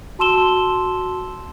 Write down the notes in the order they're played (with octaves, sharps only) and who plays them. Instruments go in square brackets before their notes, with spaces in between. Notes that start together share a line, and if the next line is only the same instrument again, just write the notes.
[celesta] F#4 A5 C6 E6 E7 G7